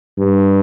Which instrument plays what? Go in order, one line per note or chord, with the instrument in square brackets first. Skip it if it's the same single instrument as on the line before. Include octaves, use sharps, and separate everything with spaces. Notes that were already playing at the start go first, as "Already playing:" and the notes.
[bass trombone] G2